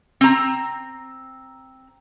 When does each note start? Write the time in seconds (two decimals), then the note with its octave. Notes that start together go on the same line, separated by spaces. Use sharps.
0.21 C4 A#5